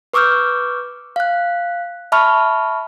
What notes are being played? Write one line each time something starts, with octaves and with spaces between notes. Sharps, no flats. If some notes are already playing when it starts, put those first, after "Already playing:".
B4 C#6 D6 E6 F6 G6
F5 F#6
E5 A5 B5 C#6 F6